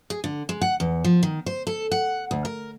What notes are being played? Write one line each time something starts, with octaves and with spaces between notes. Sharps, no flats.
G#4
D3
G#3
F#5
E2
F3
D#3
C5
A4
F#5
D2
A#4